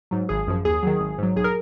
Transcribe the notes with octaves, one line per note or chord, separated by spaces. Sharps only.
G#2 F#3
G#1 G#4
F#2 F3
D#2 G#4
D#3 F#3
G#1
G#2 F#3
B1 G#4
A#4